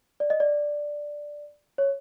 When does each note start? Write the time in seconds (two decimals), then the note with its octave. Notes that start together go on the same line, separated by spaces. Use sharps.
0.20 D5
0.30 D#5
0.40 D5
1.78 C#5